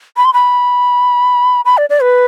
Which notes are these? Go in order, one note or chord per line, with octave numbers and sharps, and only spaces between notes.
B5
C6
B5
B5
D5
D5
B4